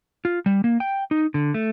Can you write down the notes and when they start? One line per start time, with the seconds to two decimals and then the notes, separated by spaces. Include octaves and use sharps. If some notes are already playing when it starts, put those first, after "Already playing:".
0.25 F4
0.46 G3
0.64 A#3
0.80 G5
1.11 D#4
1.34 D3
1.54 A3